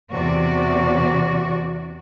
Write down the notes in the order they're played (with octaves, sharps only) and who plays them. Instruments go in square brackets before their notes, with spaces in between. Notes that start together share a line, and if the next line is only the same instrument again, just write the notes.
[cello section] E2 C3 F#4 D5